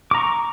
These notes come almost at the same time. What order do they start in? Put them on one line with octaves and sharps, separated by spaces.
D6 A#5 C#6